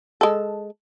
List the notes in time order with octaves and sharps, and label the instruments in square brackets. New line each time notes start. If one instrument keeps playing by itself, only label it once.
[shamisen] G#3 A4